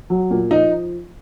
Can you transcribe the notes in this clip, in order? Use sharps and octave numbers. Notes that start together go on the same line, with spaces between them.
F#3
A#2
F3 D#4